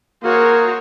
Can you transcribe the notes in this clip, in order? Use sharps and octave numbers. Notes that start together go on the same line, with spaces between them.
A#3 F#4 G#4 A#4 C5 C#5